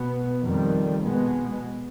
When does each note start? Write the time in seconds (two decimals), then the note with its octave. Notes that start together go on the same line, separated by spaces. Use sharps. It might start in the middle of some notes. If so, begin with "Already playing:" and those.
Already playing: B2 B3
0.42 F2 D#3 G3
1.04 B2 G#3 B3